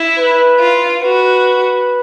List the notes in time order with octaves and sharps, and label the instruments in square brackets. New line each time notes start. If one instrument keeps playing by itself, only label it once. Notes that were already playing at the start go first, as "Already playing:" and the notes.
Already playing: [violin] E4
[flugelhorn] B4
[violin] F4
[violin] F#4 [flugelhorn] B4